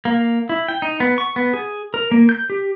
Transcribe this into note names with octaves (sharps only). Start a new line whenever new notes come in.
A#3
E4
G5
D#4
B3
C#6
B3
G#4
A#4
A#3
G6
G4